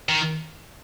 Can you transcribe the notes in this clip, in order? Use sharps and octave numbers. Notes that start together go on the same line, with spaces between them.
D#3